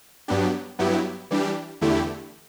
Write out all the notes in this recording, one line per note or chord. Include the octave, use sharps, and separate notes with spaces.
G2 F#3 B3 D4 G4
G2 F#3 B3 E4 G4
E3 G3 D4 G4
E2 D3 A3 E4 G4